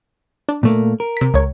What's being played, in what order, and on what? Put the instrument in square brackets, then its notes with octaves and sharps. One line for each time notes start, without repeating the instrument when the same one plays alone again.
[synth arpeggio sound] D4
[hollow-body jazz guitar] A#2 A3 A#3
A#4
[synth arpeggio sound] C3 B6
C#2 C#5